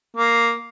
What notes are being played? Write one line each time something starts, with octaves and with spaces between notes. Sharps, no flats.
A#3